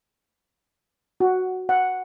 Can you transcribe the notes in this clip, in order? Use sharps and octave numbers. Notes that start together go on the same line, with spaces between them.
F#4
F#5